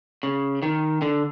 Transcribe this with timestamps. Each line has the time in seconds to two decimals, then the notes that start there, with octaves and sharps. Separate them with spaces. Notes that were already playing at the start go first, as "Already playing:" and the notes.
0.23 C#3
0.63 D#3
1.02 D3